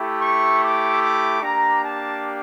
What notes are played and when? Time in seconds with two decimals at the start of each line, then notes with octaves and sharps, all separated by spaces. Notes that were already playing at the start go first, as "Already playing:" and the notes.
Already playing: A3 E4 G4
0.21 C#6
0.61 D6
1.02 D6
1.42 A#3 D4 G4 A#5
1.83 A5